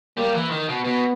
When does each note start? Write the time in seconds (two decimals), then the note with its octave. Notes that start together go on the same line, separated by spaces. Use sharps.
0.17 G3 A#3
0.34 E3
0.50 D#3
0.68 B2
0.85 B2 B3